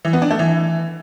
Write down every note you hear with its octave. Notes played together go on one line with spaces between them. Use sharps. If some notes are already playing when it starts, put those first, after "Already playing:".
E3
B3
D4
A3
E3